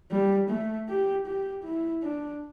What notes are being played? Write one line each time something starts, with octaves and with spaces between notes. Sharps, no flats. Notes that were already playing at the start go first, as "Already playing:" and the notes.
G3
A3
G4
G4
E4
D4